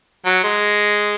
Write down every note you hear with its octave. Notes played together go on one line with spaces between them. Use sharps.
F#3
G#3